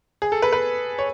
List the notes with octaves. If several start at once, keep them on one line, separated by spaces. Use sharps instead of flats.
G#4
A4
B4
B4
C#5